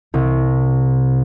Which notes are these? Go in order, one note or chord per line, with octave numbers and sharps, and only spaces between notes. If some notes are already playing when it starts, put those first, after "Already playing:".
C2